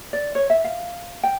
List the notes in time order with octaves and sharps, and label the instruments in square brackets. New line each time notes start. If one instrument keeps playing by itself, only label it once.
[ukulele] D5
C#5
E5
F5
G5